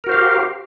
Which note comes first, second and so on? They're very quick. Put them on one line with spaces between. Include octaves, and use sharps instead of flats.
A#4 F#4 C5 F5 G4